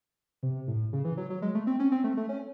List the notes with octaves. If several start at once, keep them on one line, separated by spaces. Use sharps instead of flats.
C3
A2
C#3
E3
F#3
F#3
G#3
A3
C4
C#4
C4
A3
A3
C#4